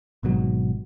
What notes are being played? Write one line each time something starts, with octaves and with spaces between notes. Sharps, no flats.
G#1 G#2 B2 F#3